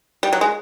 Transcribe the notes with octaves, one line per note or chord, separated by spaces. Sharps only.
G3
F#3
G#3